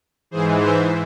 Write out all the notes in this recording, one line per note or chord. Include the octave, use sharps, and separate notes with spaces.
G#2 E3 G#4 C5
C5 E5